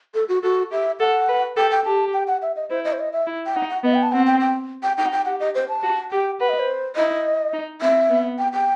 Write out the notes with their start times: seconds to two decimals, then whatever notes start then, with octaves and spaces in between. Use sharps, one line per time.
0.14 A4
0.29 F#4
0.43 F#4 A4
0.71 G4 E5
1.00 A4 F#5
1.28 B4
1.56 A4 G5
1.71 G5
1.85 G4 A5
2.13 G5
2.27 F#5
2.42 E5
2.56 D#5
2.70 E4 C5
2.85 D#5
2.93 C5
2.99 D#5
3.13 E5
3.27 E4
3.46 G5
3.55 D#4 F#5
3.70 F#5
3.84 B3 D#5
3.94 G5
4.03 A5
4.12 C4 F#5
4.27 G5
4.40 G5
4.83 G5
4.98 D#4 G5
5.06 F#5
5.12 G5
5.26 G4 F#5
5.40 D#5
5.55 C5
5.69 A5
5.83 F#4
6.11 G4 G5
6.40 B4 F#5
6.49 D#5
6.59 C5
6.96 E4 D#5
7.53 D#4
7.82 C4 E5
8.10 B3
8.38 G5
8.53 G5